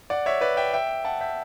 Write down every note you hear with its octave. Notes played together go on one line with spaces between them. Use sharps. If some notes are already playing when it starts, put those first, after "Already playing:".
D5 F#5
C#5 E5
B4 D5
E5 G5
E5 G5
F#5 A5
E5 G5